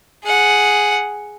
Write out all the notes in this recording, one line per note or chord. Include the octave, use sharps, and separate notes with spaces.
G#4 F#5